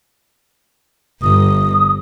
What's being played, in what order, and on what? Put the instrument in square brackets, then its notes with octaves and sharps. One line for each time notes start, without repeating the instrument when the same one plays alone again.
[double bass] G1 [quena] D#6